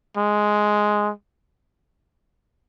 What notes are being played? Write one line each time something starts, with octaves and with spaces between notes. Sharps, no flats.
G#3